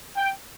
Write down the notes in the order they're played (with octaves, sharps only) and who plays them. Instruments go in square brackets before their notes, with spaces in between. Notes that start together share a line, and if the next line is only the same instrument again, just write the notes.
[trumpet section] G5